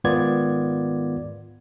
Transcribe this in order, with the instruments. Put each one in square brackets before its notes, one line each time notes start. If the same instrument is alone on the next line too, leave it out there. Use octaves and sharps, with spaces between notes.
[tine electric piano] G#2 D#3 B3 F4 D5 G#6